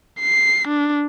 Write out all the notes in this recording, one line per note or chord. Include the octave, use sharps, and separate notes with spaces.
C7
D4